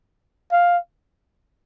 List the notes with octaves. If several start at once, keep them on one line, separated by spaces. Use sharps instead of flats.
F5